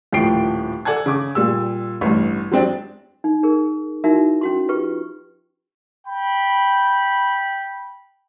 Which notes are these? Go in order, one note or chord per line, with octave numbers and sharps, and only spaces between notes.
D#1 A2 F3 G5 C7 D7
A4 D5 F#5 G#5 A5 G#6
C#3 D6
A#2 G3 G#4 E6
A1 G2
F#3 G#3 C4 D4 G4
D#4
D#4 G#4 A#4
D#4 E4 F#4 A#4 E5
C#4 F#4 C6
F4 G4 B4 C#6
G5 B5